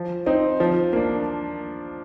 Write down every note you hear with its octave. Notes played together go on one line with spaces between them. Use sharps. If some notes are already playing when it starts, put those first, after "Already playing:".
Already playing: F3
C4 D#4
F3
A#3 D4